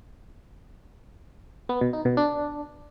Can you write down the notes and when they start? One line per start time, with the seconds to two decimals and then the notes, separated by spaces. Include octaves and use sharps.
1.69 B3
1.81 B2
1.93 D#4
2.05 B2
2.17 D4